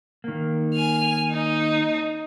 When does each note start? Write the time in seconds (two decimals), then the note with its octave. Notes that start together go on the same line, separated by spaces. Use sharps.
0.24 D#3 A#3
0.74 G#5 F6
1.31 D#4